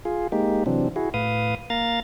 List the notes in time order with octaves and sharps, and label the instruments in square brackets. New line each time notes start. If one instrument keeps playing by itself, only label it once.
[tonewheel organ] F4 G#4
G#3 A#3 D#4 G4
C3 E3 F#3 C4 D4
E4 F#4 G#4
A2 B4 F5 D#6
A#3 F5 A#5 A6